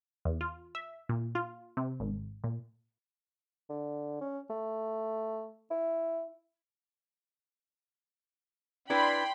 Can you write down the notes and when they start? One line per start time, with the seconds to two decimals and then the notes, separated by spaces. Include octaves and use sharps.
0.25 E2
0.41 F4
0.75 E5
1.09 A#2
1.35 F4
1.77 C3
2.00 G#1
2.44 A#2
3.69 D3
4.21 C#4
4.50 A3
5.71 E4
8.90 D4 E4 B4 G5 B5 C6